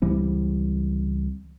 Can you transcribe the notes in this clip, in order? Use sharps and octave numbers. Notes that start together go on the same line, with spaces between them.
C#2 E3 G3 C4